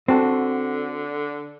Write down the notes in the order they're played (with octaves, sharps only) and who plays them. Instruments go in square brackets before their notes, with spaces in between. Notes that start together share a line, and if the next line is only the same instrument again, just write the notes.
[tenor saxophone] D3 [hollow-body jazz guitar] C4 F#4 A4